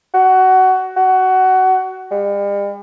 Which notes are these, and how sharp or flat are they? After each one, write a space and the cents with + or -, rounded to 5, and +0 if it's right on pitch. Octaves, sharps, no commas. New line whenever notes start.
F#4 +20
F#4 +20
G3 +45